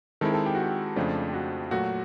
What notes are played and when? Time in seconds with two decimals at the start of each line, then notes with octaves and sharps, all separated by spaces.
0.21 D#3 G#3 C4 E4 A4
0.34 A4
0.46 G4
0.55 F#4
0.63 G4
0.96 F2 C#3 F3 A3 D4
1.33 F#4
1.71 A#2 F#3 A3 F#4